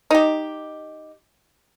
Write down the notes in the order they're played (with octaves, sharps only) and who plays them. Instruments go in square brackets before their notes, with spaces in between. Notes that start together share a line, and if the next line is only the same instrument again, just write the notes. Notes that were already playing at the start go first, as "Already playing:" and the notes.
[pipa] D#4 G4